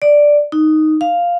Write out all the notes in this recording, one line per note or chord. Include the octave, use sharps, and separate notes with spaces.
D5
D#4
F5